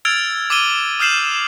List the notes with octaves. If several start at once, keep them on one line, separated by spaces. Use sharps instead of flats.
E6 F6 G#6 A6 D7 F7
D6 E6 D#7 G7
D#6 F6 G6 C7 E7 F#7